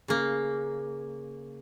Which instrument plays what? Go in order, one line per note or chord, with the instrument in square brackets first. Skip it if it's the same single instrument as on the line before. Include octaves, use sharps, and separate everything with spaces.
[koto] C#3 A#3